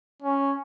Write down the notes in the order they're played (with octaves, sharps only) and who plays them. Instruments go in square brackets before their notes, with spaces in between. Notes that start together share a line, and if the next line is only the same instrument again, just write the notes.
[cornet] C#4